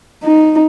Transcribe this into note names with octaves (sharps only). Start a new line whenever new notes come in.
D#4